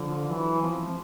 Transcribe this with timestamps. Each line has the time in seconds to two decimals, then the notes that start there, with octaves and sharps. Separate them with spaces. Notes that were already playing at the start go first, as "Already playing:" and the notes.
Already playing: D3 F3
0.28 E3 F#3
0.62 F3 C4
0.73 C4
0.84 G#3